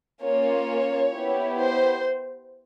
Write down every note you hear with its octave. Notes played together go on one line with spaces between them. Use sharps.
A#3 C#4 F4 C#5
B3 E4 G4
C5